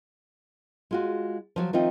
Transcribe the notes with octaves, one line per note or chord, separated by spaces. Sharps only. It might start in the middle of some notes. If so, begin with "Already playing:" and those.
G#3 F4 F#4
F3 F#3 F#4
D#3 F3 A3 C4 D#4 F4